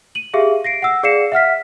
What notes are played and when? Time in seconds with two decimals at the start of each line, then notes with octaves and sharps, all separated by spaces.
0.15 D#7 F#7
0.34 G4 G#4 E5 F5
0.64 A#6 C7 D7
0.82 F#5 E6
1.03 G#4 D5 F5 C7 C#7 E7
1.32 E5 F#5 F6 B6